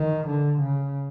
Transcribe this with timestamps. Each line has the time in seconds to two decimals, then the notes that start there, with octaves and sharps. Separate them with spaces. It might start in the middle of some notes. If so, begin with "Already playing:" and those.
Already playing: D#3
0.28 D3
0.61 C#3